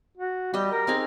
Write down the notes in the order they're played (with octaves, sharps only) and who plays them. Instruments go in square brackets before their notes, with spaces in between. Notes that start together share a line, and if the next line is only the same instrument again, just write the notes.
[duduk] F#4
[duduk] G3 [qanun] G4 D#5
[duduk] A#4
[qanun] C4 D#4 G#4